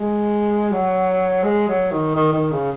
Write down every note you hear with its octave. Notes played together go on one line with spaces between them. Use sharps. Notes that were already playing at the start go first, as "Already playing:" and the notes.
Already playing: G#3
F#3
G#3
F#3
D#3
D#3
D#3
C#3